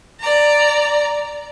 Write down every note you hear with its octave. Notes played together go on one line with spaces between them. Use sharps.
D5 A#5